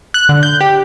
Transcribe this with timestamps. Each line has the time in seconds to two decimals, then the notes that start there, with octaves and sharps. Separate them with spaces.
0.14 F#6
0.29 D3
0.43 G6
0.61 G4